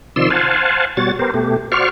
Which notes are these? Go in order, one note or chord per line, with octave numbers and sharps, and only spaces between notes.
C3 D#3 F3 D5 C6 E6
C5 F5 F#5 G#5 A5
B2 G3 F#4 C#5 A6
B3 G4 A#4 C5
B2 A3 G4
F#4 C5 D5 F5 C#6 F6